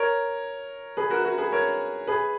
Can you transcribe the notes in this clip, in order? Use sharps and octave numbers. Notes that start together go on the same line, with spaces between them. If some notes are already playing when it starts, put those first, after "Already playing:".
Already playing: A#4 C#5
G#4 B4
F#4 A#4
F#4 A#4
G#4 B4
A#4 C#5
G#4 B4